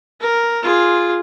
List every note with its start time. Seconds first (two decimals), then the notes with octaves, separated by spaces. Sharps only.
0.20 A#4
0.63 F4 G#4